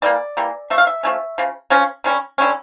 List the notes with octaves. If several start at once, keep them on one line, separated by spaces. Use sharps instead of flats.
E3 G3 A#3 D5
E3 G3 A#3
F3 A3 E5
F5
E5
F3 A3 C#4
C#3 F3
C#3 F3 C#4
D3 G3 C#4
D3 G3 C#4